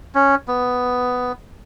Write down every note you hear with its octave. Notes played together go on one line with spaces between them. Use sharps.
C#4
B3